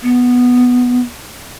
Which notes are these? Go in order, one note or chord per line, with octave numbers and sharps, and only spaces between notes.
B3